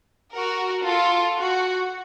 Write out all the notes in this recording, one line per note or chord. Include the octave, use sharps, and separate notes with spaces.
F#4 A#4
F4 A4
F#4